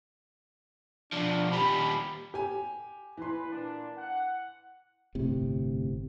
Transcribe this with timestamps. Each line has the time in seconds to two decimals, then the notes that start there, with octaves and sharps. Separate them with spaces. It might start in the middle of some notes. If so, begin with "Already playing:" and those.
1.12 B2 F3 D4
1.52 D#2 G3 B5
2.34 G4 G#5
3.17 E3 B4 C6
3.51 A#2 D4
3.97 F#5
5.15 G1 A2 C3